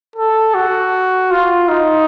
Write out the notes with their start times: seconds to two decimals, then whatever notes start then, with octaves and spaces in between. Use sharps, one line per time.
0.16 A4
0.54 F#4
1.31 F4
1.69 D#4